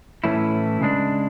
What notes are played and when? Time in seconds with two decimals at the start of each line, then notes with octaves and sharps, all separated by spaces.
0.24 A2 E3 A3 C#4 E4
0.81 C#3 G#3 D4